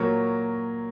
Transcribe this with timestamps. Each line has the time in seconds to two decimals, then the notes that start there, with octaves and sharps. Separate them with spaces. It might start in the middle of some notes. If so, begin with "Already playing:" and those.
Already playing: A#2 F#3 A#4 C#5